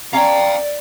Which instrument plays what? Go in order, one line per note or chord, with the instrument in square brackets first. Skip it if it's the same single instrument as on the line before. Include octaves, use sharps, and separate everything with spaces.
[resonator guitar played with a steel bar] C#4 A#5 [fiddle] D5 [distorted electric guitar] F5 G5